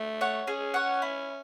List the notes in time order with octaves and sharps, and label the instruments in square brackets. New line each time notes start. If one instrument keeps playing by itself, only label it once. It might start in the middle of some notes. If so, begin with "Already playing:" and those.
Already playing: [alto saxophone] A3
[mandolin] C#5 F#5
[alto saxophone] C#4 [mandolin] G#4
[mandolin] C#5 F#5
E4